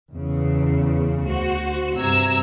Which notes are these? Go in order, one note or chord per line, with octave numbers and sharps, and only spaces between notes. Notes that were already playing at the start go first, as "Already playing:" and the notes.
E2 C#3
D2 F#4 C5
G2 C3 A#5 E6 G#6